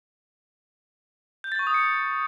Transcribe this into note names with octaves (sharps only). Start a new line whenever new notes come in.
G6
A6
C#6
D#6
C#7